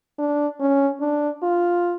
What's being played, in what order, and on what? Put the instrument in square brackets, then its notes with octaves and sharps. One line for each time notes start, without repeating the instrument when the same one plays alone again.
[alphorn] D4
C#4
D4
F4